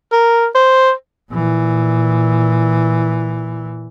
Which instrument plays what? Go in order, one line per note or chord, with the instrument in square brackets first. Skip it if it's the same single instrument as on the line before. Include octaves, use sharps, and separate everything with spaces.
[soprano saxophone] A#4
C5
[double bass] A#2 E3